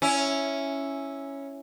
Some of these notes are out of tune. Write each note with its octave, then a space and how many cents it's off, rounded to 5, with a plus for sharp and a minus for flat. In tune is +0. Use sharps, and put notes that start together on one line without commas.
C#4 +0 E4 +0